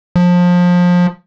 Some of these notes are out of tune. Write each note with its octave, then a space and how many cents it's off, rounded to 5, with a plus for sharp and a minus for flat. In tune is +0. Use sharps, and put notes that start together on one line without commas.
F3 +25